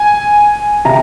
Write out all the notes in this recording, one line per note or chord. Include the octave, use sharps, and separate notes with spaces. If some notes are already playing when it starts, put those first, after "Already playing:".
Already playing: G#5
C3 A#5